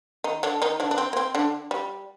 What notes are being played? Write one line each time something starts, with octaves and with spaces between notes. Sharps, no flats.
D#3 D#4
D3 D4
D#3 D#4
D3 D4
D4
C4
A#3
C4
D3 D4
G3